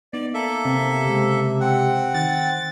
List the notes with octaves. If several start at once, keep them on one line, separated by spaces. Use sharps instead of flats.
B3 D#4 D5
A#3 A4 E5
C3
C#3 G#3
C4 F#5
D#3 A6